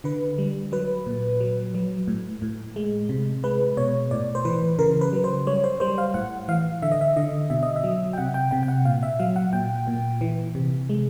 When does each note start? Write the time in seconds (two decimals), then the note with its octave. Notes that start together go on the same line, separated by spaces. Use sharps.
0.04 D3 B4
0.38 G3
0.72 F#3 B4
1.06 A#2
1.40 F#3
1.75 F#3
2.08 A2
2.42 A2
2.76 G#3
3.09 C3
3.44 G#3 B4
3.77 B2 C#5
4.11 A2 D5
4.35 C5
4.45 E3 B4
4.79 C#3 A#4
5.01 B4
5.13 F#3
5.24 C5
5.47 G3 C#5
5.64 C5
5.80 G3 C5
5.98 F5
6.14 A2 F#5
6.48 E3 F5
6.82 D3 E5
6.92 D#5
7.01 E5
7.16 D3 D#5
7.50 B2 E5
7.63 D#5
7.76 E5
7.84 F#3
8.13 G5
8.18 C3 F#5
8.34 G5
8.51 C3 G5
8.63 G5
8.68 F#5
8.85 A#2 F5
9.03 E5
9.19 F#3 F5
9.36 F#5
9.53 A#2 G5
9.87 A#2
10.21 E3
10.55 C3
10.89 G#3